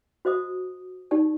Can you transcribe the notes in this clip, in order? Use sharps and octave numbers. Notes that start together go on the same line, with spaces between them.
F#4 C5 D#5 D#6
D#4 G4 D5 A5